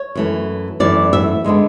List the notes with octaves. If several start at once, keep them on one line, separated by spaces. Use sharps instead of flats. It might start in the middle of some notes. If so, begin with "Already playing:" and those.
Already playing: C#5
F#2 E3 A3
F#2 E3 A3 D5
E5
D3 G#3 B3 D4